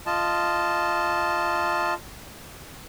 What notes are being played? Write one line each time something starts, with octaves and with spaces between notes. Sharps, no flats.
F4 D#5 A5